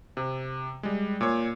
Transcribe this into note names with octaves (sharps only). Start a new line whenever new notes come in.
C3
G3 G#3
A#2 C#5